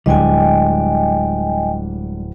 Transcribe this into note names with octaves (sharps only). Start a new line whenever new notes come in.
D1 G3 G#3 D4 D#5 G5 G#5